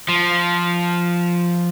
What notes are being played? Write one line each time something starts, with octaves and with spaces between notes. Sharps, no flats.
F3